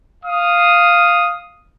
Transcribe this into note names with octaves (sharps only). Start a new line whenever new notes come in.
F5 D#6